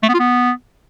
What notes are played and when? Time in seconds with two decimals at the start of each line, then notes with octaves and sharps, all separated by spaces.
0.03 A3
0.09 B3
0.14 F4
0.20 B3